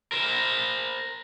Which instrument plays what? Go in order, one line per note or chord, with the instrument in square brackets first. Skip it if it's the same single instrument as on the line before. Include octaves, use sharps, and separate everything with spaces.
[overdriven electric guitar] A#4 C5